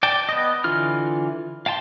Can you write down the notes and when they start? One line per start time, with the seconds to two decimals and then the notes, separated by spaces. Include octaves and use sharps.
0.03 D5 G5 A5
0.29 B3 D#5
0.64 D3 E3 F4 F6
1.66 F5 G5 A5 C6